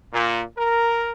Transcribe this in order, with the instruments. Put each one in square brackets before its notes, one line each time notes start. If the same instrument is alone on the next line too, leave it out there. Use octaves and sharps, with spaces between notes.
[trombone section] A#2
A#4